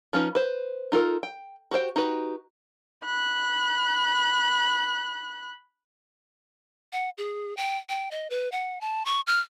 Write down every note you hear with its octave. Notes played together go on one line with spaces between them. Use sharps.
F3 C#4 D#4 B4
B4 C5
D#4 F4 A4 A#4
G5
F#4 G4 C5 G5
D#4 F#4 G4 B4
B5 F#6
F#5
G#4
G5
G5
D#5
B4
F#5
A5
C#6
F6